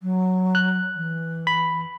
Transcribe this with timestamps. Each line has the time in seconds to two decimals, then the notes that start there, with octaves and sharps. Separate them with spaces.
0.02 F#3
0.55 F#6
0.96 E3
1.47 B5